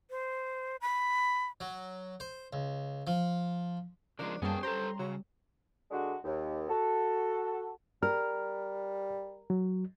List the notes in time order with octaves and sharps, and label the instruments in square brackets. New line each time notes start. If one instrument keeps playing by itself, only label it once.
[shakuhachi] C5
B5
[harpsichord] F#3
C5
C#2
F3
[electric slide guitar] C#3 F3 G#3 [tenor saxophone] D4 [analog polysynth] A#4
[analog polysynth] F#2 A#3 A5 [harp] G3 C#4 [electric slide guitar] B3 G5 [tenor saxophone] G#4
[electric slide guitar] G4 A4 [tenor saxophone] C5 [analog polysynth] A#5 C6
[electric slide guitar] C#3 [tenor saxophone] F#3
[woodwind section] D3 G#3 D4 F#4
D#2
F#4 A4
[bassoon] G3 [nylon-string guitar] A#4 [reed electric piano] F6
[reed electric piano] F#3